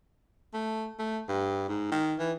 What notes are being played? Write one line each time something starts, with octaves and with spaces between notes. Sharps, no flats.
A3
A3
G2
G#2
D#3
E3